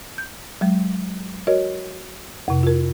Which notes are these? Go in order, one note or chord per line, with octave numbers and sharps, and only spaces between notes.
G6
F#3 G#3
F#4 A#4 C#5 D#5
F2 C3
F4 A#4